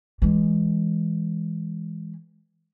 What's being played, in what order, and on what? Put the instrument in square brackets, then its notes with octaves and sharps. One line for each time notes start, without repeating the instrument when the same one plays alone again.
[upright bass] E3 G#3